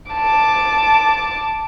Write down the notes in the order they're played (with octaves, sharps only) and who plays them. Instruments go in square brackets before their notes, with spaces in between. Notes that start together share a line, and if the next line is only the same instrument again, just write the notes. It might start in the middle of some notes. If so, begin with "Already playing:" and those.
[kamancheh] A5 D6